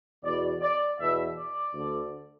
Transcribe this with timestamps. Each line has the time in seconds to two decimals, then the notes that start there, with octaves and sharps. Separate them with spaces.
0.23 E2 B2 D5
0.61 D5
0.98 E2 B2 E5
1.36 D5
1.73 D2 D3